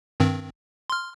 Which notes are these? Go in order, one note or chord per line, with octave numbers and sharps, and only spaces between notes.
G2 D#3 C4
C6 F6